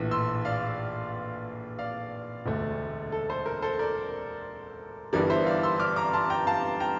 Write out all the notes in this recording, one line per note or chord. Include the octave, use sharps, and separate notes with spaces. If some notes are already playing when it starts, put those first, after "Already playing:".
Already playing: A#1 A2 E3
C6 E6
D5 F5
D5 F5
E1 D2 D3 A3
A4
A4 C5
A#4
A4 C5
A#4 D5
G1 G2 E3 G3 A#4 D5
C5 E5
D5 F5
C6 E6
D6 F6
A#5 D6
A5 C6
G5 A#5
F5 A5
G5 A#5